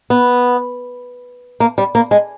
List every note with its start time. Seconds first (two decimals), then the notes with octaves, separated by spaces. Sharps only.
0.10 B3
1.60 A#3
1.78 G3
1.95 A#3
2.11 G#3